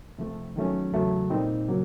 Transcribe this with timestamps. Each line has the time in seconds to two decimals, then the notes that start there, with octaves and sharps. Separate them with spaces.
0.18 C3 F3 A3
0.56 D#3 F#3 A3 C#4
0.92 E2 C#3 F#3 A3
1.30 A#2 G3 C4 D#4
1.68 C#3 F#3 A#3